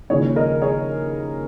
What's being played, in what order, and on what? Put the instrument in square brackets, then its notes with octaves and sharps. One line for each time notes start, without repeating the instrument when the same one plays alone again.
[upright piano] D#2 C#3 F3 G#3 G#4 C#5
A#4 D#5
G#4 C#5